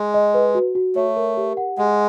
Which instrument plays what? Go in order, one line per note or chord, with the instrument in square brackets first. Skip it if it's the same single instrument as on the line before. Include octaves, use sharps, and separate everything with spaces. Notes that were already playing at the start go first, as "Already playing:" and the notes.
Already playing: [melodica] G#3
[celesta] D#5
B4
F#4
F#4
[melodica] A3 [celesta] C#5
[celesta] A#4
G4
F#5
[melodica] G#3 [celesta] F#5